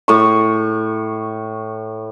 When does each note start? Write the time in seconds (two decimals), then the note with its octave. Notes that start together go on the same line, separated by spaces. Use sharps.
0.08 A2 C#6